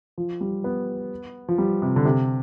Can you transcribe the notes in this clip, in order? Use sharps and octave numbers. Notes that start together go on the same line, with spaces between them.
F3
G3
B3
F3
G3
C3
D3
C3